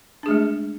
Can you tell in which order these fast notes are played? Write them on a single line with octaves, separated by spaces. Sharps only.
D4 G#4 A3 G#3